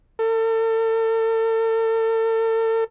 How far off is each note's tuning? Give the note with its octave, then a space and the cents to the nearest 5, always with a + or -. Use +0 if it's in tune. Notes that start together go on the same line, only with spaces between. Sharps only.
A4 +40